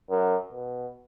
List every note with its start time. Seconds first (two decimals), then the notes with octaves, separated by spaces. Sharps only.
0.10 F#2
0.52 B2